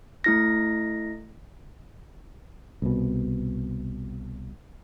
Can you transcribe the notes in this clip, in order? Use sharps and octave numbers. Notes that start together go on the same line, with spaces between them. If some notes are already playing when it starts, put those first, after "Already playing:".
A3 E4 A#6
C2 B2